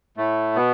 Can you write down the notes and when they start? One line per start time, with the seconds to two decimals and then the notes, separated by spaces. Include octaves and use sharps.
0.17 A2 A3
0.56 B2 B3